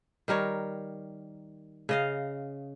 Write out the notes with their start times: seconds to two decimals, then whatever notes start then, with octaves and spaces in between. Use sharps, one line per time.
0.28 D#3 G3 A#4 C#5
1.89 C#3 D#5 F5